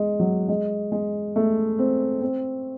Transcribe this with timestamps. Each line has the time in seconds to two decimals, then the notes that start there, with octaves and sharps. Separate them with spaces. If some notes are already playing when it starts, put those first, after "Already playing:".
Already playing: G#3
0.20 F#3
0.49 G#3
0.92 G#3
1.36 A3
1.79 C4
2.21 C4